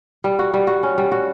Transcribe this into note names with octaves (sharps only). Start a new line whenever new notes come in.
G3
F#4
G3
F#4
C#4
G3
F#4